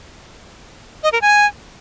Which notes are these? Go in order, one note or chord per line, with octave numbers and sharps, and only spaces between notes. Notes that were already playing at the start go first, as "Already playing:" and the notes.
D#5
A#4
G#5